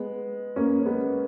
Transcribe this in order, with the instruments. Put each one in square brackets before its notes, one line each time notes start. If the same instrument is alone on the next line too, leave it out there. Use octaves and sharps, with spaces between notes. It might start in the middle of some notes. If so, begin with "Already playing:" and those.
Already playing: [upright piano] G#3 B3
A#3 C#4
C#4
G#3 B3